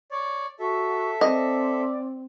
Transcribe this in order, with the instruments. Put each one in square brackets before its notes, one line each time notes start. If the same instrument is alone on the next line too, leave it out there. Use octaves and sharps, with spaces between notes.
[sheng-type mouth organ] C#5 D5
[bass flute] F#4 [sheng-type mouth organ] A4 E5
[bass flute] C4 [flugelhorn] D5 [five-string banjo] D#5